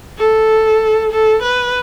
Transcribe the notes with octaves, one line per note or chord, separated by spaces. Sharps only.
A4
A4
B4